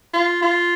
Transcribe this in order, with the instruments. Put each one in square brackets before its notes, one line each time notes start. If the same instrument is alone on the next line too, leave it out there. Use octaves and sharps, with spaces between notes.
[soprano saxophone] F4
F4